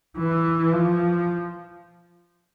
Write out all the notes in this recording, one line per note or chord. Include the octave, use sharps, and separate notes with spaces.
E3
F3